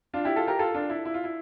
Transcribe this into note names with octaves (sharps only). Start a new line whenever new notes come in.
D4 F4
E4 G4
F4 A4
G4 A#4
F4 A4
D4 F4
E4
E4
F4
E4